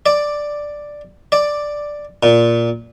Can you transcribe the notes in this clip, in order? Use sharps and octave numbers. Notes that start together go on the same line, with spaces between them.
D5
D5
A#2